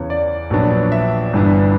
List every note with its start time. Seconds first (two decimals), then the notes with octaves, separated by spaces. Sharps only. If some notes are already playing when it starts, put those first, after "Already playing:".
Already playing: E2 C#3 E3 C#5
0.10 D5
0.50 A#1 A#2 F#3 B3 D4
0.92 E5
1.33 G1 G2 E3 B3 D4